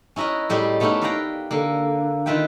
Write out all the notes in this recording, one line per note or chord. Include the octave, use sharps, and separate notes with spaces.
C#4 E4 A#4 B4 D#5
A2 G3 G#3 G4
A3 B3 C#4 D#4 E4 G4
A#4 B4 D5 F5 G5 A#5
D3 A#3
D#3 E4 F4 B4 E5 G5